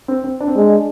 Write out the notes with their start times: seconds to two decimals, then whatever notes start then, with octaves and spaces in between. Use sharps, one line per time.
0.08 C4
0.24 C4
0.41 D4
0.48 C4
0.56 G#3 D4